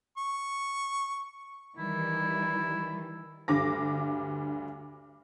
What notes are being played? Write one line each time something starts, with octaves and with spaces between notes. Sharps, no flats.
C#6
D#3 E3 G3 E4
D2 G2 D6 A#6